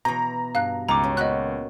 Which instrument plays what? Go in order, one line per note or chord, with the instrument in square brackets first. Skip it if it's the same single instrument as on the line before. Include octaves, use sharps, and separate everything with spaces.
[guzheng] B2 E3 [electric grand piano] A#5
[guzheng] G2 [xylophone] F5 F#6
[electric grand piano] C#2 [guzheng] D#4 [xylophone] A#5 D6
[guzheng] C#4
[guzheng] A#2 B3 F#4 [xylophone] D#5 F#6